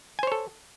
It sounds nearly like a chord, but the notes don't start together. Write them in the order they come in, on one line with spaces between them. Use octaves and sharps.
G#5 C5 C#5 A4